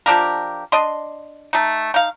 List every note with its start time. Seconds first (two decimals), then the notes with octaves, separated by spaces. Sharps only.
0.06 F3 D4 G4 A#4
0.72 D4 D#5 C6
1.53 A3 D#4
1.94 D#4 F5